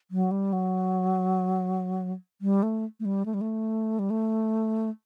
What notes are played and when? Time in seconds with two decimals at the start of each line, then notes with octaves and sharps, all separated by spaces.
0.11 F#3
0.31 G3
0.53 F#3
2.41 G3
2.63 A3
3.00 A3
3.05 G3
3.26 A3
3.34 G3
3.41 A3
3.99 G3
4.10 A3